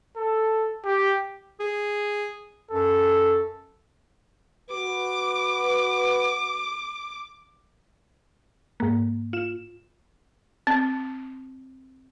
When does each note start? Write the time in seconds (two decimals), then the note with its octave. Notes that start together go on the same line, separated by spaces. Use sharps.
0.17 A4
0.85 G4
1.60 G#4
2.71 F#2 A4
4.70 F#4 B4 D6
8.80 G#2 A#3
9.33 F4 E7
10.67 C4